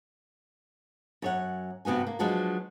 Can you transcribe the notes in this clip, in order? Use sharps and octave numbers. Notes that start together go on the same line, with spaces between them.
F#2 C#5 F#5
G2 C3 B3 F#4 G#5
A#3
F3 F#3 G#3 D4 F#4 B4